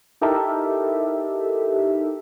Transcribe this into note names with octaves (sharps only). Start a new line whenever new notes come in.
D#4 E4 G4 A4 A#4 E5